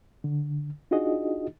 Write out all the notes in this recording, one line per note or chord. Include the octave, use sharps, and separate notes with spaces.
D3
D4 D#4 F4 F#4 G#4 D#5